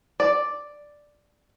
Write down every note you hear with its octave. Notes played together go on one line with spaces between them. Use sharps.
D5